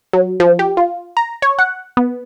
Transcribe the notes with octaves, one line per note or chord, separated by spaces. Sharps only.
F#3
F3
G4
F4
A#5
C#5
F#5
B3